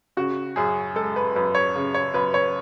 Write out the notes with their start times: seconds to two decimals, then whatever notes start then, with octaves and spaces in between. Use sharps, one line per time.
0.17 C#3 F#4
0.56 F#2 G#4
0.95 G#3 A4
1.16 B4
1.36 F#2 B4
1.55 C#5
1.76 C#3
1.94 C#5
2.14 F#2 B4
2.34 C#5